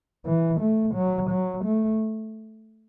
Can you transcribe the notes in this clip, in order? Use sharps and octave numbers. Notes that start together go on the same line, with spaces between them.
E3
A3
F#3
F#3
A3